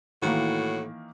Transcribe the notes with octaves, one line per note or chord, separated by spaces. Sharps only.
A2 D#3 E3 A#3 F#4